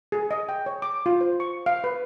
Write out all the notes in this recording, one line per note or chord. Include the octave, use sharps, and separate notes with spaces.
G#4
D#5
G5
C#5
D6
F4
C5
C#6
F5
B4